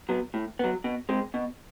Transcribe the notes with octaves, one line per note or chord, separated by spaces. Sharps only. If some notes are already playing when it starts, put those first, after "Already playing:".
F#3 B3
A2
F#3 B3
B2
G#3 C4
B2